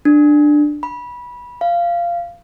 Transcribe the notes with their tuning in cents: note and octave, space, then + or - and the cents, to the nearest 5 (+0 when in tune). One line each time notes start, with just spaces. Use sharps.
D4 +10
B5 -20
F5 -15